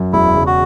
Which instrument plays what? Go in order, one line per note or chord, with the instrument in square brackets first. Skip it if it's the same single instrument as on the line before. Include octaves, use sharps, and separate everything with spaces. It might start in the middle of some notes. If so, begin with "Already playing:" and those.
Already playing: [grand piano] F#2
[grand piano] E1 [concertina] E4
[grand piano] C#3
[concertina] F#4